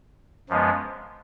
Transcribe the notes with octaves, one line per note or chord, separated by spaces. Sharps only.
F#2 F3 G#3 B3